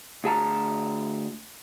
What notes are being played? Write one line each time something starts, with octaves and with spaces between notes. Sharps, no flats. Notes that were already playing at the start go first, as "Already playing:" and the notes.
D2 G#4 A5 A#5